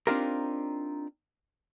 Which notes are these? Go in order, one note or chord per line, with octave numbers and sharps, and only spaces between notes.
C4 D4 D#4 F4 G4 A#4